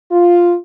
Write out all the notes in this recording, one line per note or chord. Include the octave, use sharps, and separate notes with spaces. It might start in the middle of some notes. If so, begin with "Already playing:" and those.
F4